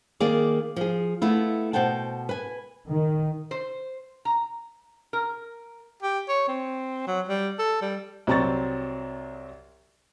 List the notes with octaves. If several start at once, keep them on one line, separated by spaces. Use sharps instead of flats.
D#3 A#3 G#4 D5
F3 G#4
A3 B3 E4 F4
B2 C5 F#5 G5 A5
B4 G#5
D#3
C5
A#5
A#4
G4
C#5
C4
F#3
G3
A4
G3
C2 F#3 C4 A#5 C#6 A6